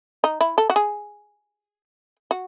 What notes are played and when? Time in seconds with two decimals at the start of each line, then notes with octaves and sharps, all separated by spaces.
0.24 D#4
0.41 E4
0.58 A4
0.70 F#4
0.76 G#4
2.31 F#4